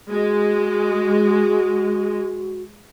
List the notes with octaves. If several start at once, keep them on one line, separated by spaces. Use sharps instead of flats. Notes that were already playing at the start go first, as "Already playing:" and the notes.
G#3 F#4